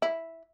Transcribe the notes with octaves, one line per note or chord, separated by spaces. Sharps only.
E4